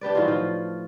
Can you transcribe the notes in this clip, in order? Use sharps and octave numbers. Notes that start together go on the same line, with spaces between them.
D4 G4 B4 D5
A2 D#3 F#3 F4
F3